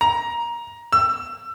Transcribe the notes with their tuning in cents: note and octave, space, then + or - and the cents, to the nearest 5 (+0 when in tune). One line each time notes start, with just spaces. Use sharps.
A#5 +15
E6 +25